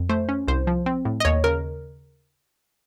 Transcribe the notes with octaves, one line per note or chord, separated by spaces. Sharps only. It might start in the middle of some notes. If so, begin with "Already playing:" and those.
Already playing: F2
A3 C5
C#4
C2 C5
F3
C4
A2
D#5
D#2 C#5
C#3 A#4